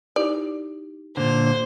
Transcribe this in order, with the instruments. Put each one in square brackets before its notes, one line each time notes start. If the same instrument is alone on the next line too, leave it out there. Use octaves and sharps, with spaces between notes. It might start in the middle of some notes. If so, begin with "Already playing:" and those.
[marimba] D#4 E4 G4 [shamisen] D5
[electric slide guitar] A#2 D3 [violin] C5